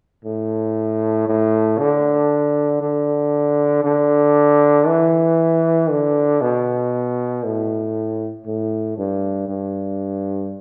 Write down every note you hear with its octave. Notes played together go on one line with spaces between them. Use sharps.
A2
A2
D3
D3
D3
E3
D3
B2
A2
A2
G2
G2